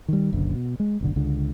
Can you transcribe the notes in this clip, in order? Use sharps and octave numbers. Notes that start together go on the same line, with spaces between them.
D#3 G3
F#1 B1 F#2 D3
B2
G#3
F#1 B1 D3
C#2 D3